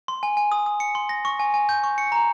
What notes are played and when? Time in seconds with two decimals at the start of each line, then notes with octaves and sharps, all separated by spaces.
0.08 C6
0.23 G#5
0.37 G#5
0.52 D#6
0.66 D#6
0.80 C#7
0.95 C6
1.09 A#6
1.25 C#6
1.40 G#5
1.54 G#5
1.69 G6
1.84 C#6
1.98 C#7
2.12 A#5